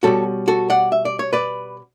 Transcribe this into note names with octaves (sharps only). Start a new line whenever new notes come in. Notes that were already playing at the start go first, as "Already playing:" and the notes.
B2 G3 C#4 F#4 A4
F#4 A4
D5 F#5
E5
D5
C#5
B4 D5